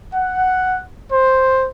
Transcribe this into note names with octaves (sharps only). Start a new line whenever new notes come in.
F#5
C5